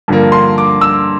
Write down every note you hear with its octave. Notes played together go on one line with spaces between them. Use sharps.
G2 D3 F3 A#3
C6
D6
E6